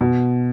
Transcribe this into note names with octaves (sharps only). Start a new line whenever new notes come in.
B2